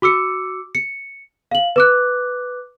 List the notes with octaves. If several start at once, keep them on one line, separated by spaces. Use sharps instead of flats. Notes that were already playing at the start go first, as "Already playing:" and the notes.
F#4 D6 E6 C#7
C#7
F5 F#7
B4 D6 F#6